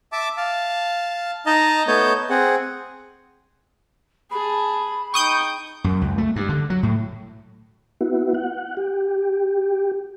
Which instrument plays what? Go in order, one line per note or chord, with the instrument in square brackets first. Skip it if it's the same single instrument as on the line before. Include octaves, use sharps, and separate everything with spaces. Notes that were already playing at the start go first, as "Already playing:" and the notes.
[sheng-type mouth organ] E5 A5 D6
F5 A5
D#4 D#5 A5 A#5
A3 B3 C#5 D#5 A5 G6
C4 G#4 F#5
[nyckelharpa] G#4 A5 [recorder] B5
[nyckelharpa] D#4 G5 [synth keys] C#6 D#6 G6
[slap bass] F#2
C#2
A3
G2
D3
F#3
A2
[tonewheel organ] B3 E4 F#4
F#5
G4